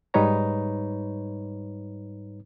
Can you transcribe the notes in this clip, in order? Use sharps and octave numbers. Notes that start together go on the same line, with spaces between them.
G#2 G3 D#4 B4 C#5 A#5